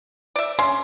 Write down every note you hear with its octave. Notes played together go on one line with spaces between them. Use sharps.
D5 E5
C#4 C6